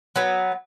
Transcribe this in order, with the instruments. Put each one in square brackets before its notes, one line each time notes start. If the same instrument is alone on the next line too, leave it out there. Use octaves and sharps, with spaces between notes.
[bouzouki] F#3 B3